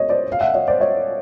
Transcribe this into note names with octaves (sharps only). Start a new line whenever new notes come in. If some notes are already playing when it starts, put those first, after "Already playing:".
Already playing: C#5 D#5
C5 D5
F5
E5 F#5
C#5 D#5
C5 D5
C#5 D#5